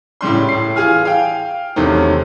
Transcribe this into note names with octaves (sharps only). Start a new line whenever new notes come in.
A2 C#3 G3 C6
A2 C7
E3 F4 G#4 G#5 F6
F5 G5
E2 C3 D#3 F#3 A3 C#4